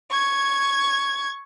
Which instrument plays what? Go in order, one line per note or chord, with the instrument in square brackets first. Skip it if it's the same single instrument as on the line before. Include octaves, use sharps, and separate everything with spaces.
[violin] C#6 G#6